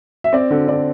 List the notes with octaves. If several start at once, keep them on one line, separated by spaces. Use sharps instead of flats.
E5
C4 D5
D3
D3 D5